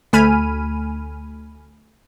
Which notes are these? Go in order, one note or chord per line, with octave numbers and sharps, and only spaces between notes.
D2 A3 G#5 B5 F6 D#7